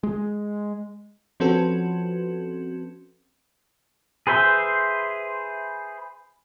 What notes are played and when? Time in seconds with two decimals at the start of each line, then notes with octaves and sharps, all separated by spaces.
0.03 G#3
1.40 F3 C4 C#4 F#4 A4 B4
4.27 G#4 B4 C5 E5